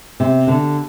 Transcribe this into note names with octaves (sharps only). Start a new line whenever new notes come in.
C3
D3